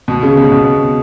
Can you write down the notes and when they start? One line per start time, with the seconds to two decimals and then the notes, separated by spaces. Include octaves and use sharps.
0.08 B2
0.23 C#3
0.37 B2
0.52 B2